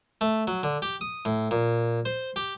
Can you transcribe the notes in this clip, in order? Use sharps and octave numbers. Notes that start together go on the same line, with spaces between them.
A3
F#3
D3
G4
D#6
A2
A#2
C5
G4